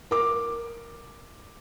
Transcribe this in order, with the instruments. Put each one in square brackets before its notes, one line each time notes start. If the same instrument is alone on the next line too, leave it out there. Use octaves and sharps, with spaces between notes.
[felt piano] A#4 D6